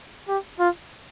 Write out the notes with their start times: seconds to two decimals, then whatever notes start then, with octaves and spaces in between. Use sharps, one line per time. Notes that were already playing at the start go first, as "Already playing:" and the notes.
0.28 G4
0.60 F4